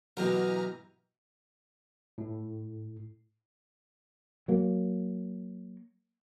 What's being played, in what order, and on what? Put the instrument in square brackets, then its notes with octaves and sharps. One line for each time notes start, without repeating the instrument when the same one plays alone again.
[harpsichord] B2 A#4 [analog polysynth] E3 A#5 F6 [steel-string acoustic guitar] F#3 G4 D#5
[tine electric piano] A2
[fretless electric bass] F#3 A#3